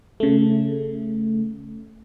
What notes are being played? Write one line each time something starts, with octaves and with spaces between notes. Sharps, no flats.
C#3 A3